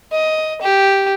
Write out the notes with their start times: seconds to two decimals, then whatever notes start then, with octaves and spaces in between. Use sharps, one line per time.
0.12 D#5
0.62 G4